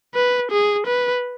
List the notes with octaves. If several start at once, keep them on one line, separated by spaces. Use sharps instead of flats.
B4
G#4
B4